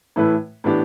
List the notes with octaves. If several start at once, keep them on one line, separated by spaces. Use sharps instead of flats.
A2 E3 A3 E4 B4
A2 E3 B3 D4 G4